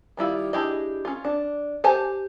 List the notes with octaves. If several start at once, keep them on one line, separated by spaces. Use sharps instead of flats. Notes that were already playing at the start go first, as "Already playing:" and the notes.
D#3 G3 E4 F4
D4 E4 G4 G#4 D#5
C#4 F4
D4
G4 C5 G#5 A5